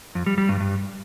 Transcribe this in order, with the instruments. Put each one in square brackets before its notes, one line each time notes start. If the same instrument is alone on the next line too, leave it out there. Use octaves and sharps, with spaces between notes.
[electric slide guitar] F2
G3
G3
G2
G2